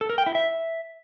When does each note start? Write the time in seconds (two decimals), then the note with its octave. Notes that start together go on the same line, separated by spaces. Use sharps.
0.01 A4
0.10 A#4
0.18 G5
0.26 E4
0.35 E5